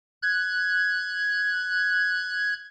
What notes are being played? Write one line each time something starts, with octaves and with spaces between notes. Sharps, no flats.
F#6 G#6